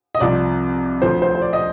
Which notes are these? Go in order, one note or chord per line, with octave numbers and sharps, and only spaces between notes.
D#5
C2 C3 F3 D5
D2 D3 F3 C5
C5
C5
D5
D#5